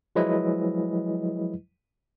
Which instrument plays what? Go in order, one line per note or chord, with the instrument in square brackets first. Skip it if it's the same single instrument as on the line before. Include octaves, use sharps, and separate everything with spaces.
[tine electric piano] F3 F#3 G#3 E4 B4 D#5